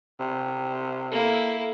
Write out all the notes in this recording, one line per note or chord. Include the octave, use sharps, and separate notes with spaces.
C3
A#3 E4 A4